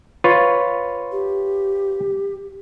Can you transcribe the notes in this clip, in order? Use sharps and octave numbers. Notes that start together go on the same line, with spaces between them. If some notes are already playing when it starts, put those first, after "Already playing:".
F4 B4 C#5
G4